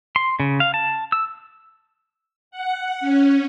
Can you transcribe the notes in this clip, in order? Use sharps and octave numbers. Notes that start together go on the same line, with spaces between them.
C6
C#3
F5
A5
E6
F#5
C#4